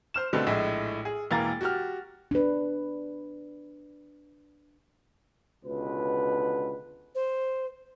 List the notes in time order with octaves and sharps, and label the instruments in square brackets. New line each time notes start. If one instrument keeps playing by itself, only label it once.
[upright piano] C5 F6 E7
B2 D3 G3 A3 B3 C4
A#1 A2 G#3 E4 E5 E6
G#4
E1 E3 A#3 F5 A#5 A6
F#4 G4 F6
[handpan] D4 B4
[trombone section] C#2 B2 D3 B4
[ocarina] C5